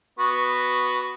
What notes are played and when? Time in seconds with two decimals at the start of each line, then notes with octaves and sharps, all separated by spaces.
0.19 B3 F#4 C#6